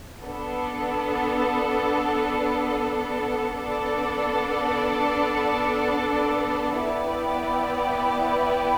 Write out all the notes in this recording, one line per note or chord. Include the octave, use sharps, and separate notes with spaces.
B3 D4 A4
B3 D4 A4 D5
B3 E4 B4 D5 G5